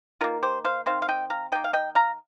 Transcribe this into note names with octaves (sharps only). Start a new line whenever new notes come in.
D#3 A#3 F4 A#4
G4 C5
C5 F5
D#3 C4 C5 F5
F5
D#5 G5
F5 A#5
D#3 A#3 D#5 G5
F5
D#5 G5
F5 A#5